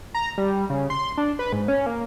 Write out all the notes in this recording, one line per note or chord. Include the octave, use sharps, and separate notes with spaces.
A#5
G3
C#3
C6
D4
B4
G#2
C#4
A#3